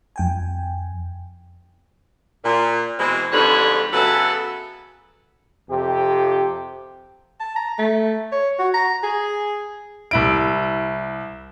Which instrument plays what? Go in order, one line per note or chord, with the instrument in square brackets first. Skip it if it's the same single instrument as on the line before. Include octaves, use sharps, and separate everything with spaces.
[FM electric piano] F2 G5 G#5
[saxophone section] A#2
B2 E3 G#3 C4
F2 G#2 D3 G3 B4 C#5
C#3 F#3 B3 A4 B4 E5
[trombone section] F2 C3 G4
[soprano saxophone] A5
A#5
A3
C#5
F#4
A#5
G#4
[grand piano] C2 E4 D7